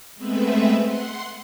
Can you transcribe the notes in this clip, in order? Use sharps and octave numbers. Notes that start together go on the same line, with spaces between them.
G#3 A3 B3 C4 B4 E5
F#5 C6